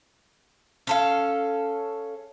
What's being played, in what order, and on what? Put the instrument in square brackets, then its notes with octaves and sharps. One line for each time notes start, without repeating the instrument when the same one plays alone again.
[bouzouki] C#4 A4 F5